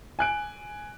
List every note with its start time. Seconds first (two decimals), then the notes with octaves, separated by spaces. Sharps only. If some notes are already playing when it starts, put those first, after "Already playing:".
0.19 G#5 F#6 D7